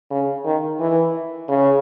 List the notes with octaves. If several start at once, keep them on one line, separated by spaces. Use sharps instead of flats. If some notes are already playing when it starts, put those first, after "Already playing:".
C#3
D#3
E3
C#3